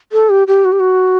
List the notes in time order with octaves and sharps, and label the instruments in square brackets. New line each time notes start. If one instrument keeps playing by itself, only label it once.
[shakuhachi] A4
G4
G4
F#4
G4
F#4